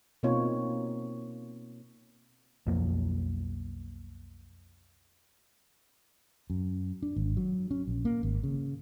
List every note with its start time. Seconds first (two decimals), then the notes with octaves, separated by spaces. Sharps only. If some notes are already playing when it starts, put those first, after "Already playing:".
0.23 B2 A#3 C4 D#4 F4 C#5
2.67 B1 F2 F3 A#3
6.50 F#2
7.03 D4
7.16 G#1
7.37 F#3
7.71 C#4
7.87 A#1
8.05 A#3
8.23 G#1
8.43 C#3